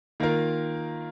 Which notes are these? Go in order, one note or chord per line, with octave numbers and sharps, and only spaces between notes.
D#3 A#3 F4 A#4